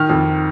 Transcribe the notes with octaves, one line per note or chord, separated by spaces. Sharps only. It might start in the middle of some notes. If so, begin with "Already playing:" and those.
Already playing: D#3 F6
F2